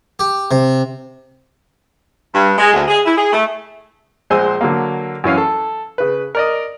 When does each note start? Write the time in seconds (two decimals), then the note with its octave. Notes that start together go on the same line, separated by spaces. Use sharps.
0.19 G4
0.51 C3
2.34 G2
2.58 G#3
2.74 D2
2.88 G#4
3.06 E4
3.18 G#4
3.32 A3
4.30 A#1 G#3 C5 G#5 C6 E6
4.61 D3 F#3 A#3
5.24 F#2 E3 C#4 F5
5.38 A4
5.98 C#3 B4
6.35 A#4 D5 D#5